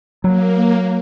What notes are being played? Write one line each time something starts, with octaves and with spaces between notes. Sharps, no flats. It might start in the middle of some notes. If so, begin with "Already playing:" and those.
F#3 A#3